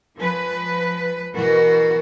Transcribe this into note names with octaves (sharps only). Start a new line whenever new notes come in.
F3 C4 B4 C#5 G#5
B2 E3 F#4 A#4 B4